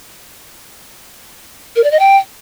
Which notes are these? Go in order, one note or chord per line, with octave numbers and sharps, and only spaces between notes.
A#4
D5
D#5
G5